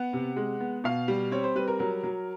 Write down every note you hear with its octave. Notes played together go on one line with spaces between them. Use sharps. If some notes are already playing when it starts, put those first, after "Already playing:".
Already playing: B3 F#5
C3
G#3
B3
B2 F5
G3
C4 C#5
C5
G3 B4
A#4
F#3 A#4
F#3